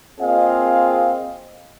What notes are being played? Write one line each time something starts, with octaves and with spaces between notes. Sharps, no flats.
A#3 C4 F4 G#4 D#5 F5